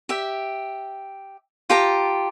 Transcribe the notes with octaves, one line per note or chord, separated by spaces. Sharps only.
G4 E5
F4 G4 A5 A#5